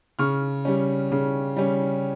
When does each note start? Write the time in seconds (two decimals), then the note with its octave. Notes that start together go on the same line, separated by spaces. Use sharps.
0.19 C#3 C#6 F6
0.65 G3 C#4
1.12 C#3
1.56 G3 C#4